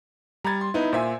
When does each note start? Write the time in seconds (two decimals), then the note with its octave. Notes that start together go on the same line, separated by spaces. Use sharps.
0.44 G3 A#5 B5 G#6 A6
0.61 C6
0.74 B3 D#4 E4
0.93 A#2 C5 E5 G#5